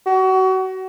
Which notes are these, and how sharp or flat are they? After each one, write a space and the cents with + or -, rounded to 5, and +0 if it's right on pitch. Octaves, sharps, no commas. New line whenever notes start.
F#4 +30